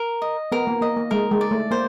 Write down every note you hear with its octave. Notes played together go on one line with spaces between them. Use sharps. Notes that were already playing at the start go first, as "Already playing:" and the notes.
Already playing: A#4
D#5
B3 A#4
A#3
A#3 D#5
A#3
G#3 A#4
G#3
D5
A3
A#3 C5